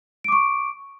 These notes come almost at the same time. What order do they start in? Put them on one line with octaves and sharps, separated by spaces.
D7 D6 C#6